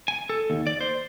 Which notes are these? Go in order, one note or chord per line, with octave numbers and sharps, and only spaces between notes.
G#5
A4
D#2
D5
C5